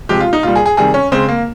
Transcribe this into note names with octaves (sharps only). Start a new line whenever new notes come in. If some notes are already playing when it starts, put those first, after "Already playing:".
C3 F3 G#3 G4
F4
D#4
A#2 G3 F4
G#4
G#4
C3 D#3 G3 G#4
C#4
C#3 G#3 C4
A#3